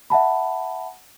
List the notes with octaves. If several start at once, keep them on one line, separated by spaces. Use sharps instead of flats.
E5 F#5 A5 B5